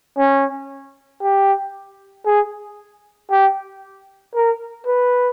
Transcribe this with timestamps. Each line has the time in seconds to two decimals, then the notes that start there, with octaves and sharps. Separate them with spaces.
0.17 C#4
1.22 G4
2.26 G#4
3.31 G4
4.35 A#4
4.87 B4